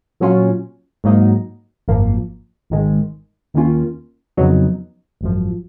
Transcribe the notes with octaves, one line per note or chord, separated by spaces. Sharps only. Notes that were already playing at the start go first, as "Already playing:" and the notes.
A#2 F#3 C#4 F4
G#2 F#3 A#3 D#4
G#1 F#2 F3 A#3
G#1 G#2 D#3 G#3
D#2 D#3 A#3 C#4 F4
F2 C#3 F#3 B3 D#4
G#1 F#2 F3